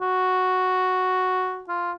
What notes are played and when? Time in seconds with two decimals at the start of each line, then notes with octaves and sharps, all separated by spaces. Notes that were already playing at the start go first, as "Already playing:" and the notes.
0.02 F#4
1.69 F4